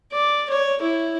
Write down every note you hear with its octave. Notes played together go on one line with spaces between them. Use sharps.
D5
C#5
E4